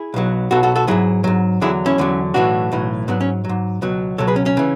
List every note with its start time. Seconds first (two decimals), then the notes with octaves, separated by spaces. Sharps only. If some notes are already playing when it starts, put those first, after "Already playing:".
Already playing: E4 G#4
0.14 B1 B2 F#3
0.51 B1 B2 F#3 F#4 A4
0.63 F#4 A4
0.76 F#4 A4
0.88 G#2 F#3 E4 G#4
1.24 G#2 F#3
1.61 E2 D3 F#3 E4 G#4
1.86 C#4 E4
1.98 E2 D3 F#3
2.34 B1 A2 E3 D4 F#4
2.72 B1 A2 E3
3.08 G#2 F#3 B3 D4
3.21 C#4
3.44 G#2 F#3
3.82 C#2 B2 F#3
4.18 C#2 B2 F#3 A4 C#5
4.27 G#4 B4
4.36 C#4
4.46 C#4
4.57 C#3 E3